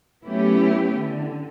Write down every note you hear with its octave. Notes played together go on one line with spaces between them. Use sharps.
F#3 A3 B3 C#4 E4 G4
D3